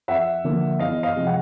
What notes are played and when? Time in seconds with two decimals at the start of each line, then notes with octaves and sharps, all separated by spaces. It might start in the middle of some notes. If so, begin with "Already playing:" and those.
0.08 F2 E5 F#5
0.44 D3 F3 A#3
0.79 E2 D#5 F5
1.03 D#5 F5
1.15 C3 F3 G#3
1.27 F#5